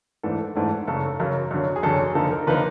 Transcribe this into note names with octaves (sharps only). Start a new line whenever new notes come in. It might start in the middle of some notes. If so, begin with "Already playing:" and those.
G#2 E3 A3 D4 A4
G#2 E3 A3 D4
F#2 C#3 F#3 A4
F#2 C#3 F#3 A#4
F#2 D3 F#3
G#4
F#2 D3 F#3 A4
G#4
D3 F3 A#3 D#4 A4
A#4
D3 F3 A#3 D#4 B4